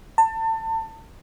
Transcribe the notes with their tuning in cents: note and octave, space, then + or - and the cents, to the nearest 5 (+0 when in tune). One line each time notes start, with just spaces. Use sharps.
A5 +30